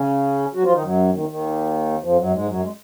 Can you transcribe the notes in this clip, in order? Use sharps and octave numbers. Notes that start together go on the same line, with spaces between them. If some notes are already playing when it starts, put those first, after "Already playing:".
Already playing: C#3 C#4
F#3 F#4
F3 F4
D#3 D#4
F#2 F#3
D#2 D#3
D#2 D#3
F2 F3
F#2 F#3
G#2 G#3
F#2 F#3
G#3